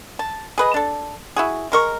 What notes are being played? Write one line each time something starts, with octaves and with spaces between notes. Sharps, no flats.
A5
G#4 B4 D#5
D4 A4
E4 F#4 G#4
G#3 A#4 C#6